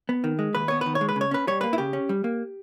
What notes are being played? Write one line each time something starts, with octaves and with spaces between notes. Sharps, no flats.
B3
D#3
G#3
D#2 B4
B3 C#5
D#3 B4
C#5
G#3
B4
C#3
C#5
C#4 B4
G3 C#5
A#3 B4
E4
C#3 G4
C#4
G3
A#3